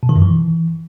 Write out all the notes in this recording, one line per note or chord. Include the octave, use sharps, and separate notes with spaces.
B2
D#3
F#2
E3